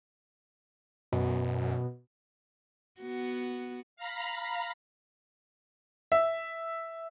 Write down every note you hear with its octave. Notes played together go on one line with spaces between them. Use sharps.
F#2 B2
B3 F#4
F5 A#5 B5
E5